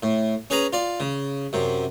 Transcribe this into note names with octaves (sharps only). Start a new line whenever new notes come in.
A2
C#4 G#4 B4 A#5
F4 D5
C#3
F#2 C3